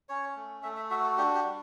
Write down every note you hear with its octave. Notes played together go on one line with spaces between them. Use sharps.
C#4 C#5
A3
A3 E5
E5
F#4 E5
A4
D4 G4
G4
G3